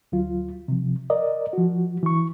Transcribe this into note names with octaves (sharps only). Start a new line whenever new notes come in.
D2 F#3 F4
C3 F3
A#4 D5 D#5
F3 F#4
E3 C#6